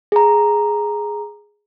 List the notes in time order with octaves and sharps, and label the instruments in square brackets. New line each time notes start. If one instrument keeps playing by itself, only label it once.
[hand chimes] G#4 A#5